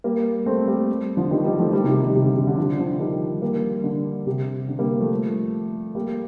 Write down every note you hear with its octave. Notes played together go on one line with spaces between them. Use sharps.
G3 A#3
A3 C4
G3 A#3
D3 F3
D#3 G3
D#3 G3
F3 A3
D#3 G3
C3 D#3
D#3 G3
C3
D3
C3
D3
D3 F3
D3 F3
D#3 G3
G3 A#3
D3
C3
D3
G3 A#3
F3 A3
G3 A#3